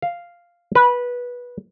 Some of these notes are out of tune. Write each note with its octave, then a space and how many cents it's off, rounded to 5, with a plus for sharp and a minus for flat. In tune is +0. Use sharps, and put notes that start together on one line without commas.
F5 -5
B4 -15